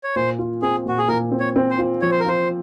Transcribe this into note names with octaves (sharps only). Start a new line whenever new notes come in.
C#5
A#2 C5
F4
C4 G#4
A#2 F#4
G#4
A#2 A#4
C4
C#5
C4
C5
F4
F3 C#5
C5
A#4
F4 C5